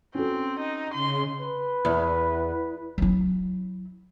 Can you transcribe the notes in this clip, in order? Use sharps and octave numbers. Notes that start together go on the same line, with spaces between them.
C4 C#4 F#4 A4
D#4
C#3 C6
B4
E2
F#3 E4